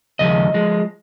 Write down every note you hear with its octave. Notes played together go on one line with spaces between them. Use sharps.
D#2 C#3 F3 G#3 D#5
F3 G#3